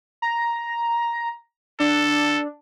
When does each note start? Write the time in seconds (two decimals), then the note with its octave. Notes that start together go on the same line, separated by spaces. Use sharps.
0.22 A#5
1.80 D4 A4